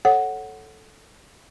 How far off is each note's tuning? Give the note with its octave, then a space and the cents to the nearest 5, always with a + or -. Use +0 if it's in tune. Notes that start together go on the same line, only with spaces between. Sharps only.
A4 -5 C#5 -15 F#5 +0